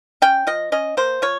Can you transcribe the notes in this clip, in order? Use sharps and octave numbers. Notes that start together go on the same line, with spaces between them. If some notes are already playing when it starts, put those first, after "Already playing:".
C#4 G5
F3 D#5
C#4 D#5
A#3 C5
F3 C#5